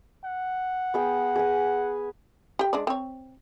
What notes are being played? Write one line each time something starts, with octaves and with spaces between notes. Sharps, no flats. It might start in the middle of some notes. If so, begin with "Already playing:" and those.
F#5
B3 G#4 G5
G#4 B4 G#5
G4 G5
G#3 D4 D5
C4 C#5